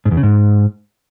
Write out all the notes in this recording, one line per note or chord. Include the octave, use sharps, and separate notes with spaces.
G#2
E2
C#3
G#2